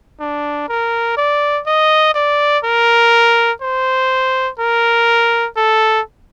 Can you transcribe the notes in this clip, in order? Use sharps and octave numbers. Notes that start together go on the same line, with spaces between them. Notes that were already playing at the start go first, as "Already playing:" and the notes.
D4
A#4
D5
D#5
D5
A#4
C5
A#4
A4